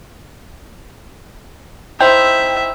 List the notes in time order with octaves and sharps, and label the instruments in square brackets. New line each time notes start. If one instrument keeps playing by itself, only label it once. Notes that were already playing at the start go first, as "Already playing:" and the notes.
[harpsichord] D#4 E4 C5 [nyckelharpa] E5 [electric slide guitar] G5